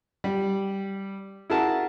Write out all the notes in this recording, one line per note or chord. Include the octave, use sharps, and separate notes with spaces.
G3
E4 F#4 G#4 A#4 F#5 A5